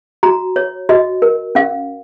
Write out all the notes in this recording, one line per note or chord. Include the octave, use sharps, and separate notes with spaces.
F#4 A#5
C#5
F#4 D#5
A#4
C#4 F5